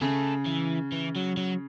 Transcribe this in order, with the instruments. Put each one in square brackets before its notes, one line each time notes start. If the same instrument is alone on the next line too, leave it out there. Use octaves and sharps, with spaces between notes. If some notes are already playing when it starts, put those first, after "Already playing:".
[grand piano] C#3 [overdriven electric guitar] A3
[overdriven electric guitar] E3
E3
F#3
F#3